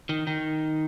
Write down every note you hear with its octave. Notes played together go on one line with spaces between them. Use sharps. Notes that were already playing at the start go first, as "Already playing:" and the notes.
D#3
D#3